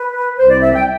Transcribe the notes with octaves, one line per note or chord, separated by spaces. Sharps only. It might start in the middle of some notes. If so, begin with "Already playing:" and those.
Already playing: B4
C2 C3 G3 C4 C5
D5
E5
G5